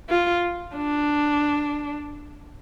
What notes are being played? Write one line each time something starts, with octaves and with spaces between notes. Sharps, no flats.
F4
D4